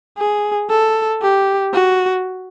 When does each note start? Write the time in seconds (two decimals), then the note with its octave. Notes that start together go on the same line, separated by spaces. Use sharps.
0.18 G#4
0.70 A4
1.22 G4
1.73 F#4